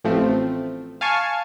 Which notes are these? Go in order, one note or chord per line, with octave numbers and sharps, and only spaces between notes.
A1 F3 A3 C4
F5 G#5 A5 C#6